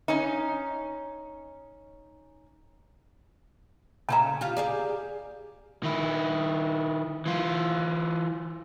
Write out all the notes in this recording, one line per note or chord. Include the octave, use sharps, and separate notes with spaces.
C#4 D#4
C#3 C#4 E5 A5 A#5
F4 G4
G4 G#4 D5
D#3 E4
E3 F4